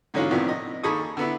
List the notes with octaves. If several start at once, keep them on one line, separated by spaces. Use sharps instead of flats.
G#2 D3 E3 C#4 F4 F#4
A2 C3 D#3 F3 B3 D4
D#5
D#2 G#4 A4 B5 C#6 D#6
D3 B3 E4